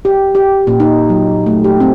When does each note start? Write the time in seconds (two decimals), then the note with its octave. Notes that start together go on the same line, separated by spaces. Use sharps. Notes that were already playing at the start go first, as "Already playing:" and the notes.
0.05 G4
0.35 G4
0.67 A#2
0.80 D#4
1.10 F#3
1.46 A3
1.64 G4
1.80 C4